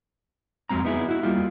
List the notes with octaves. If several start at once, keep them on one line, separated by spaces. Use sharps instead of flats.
F2 F#3 G#3 C4 A#5
B3 D#4 E4 G4 G#4
E4 F#4
G3 A#3 F4